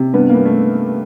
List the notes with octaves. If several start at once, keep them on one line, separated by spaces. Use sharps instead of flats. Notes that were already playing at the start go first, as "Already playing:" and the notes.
Already playing: C3
G2 B3
G2 A#3
A3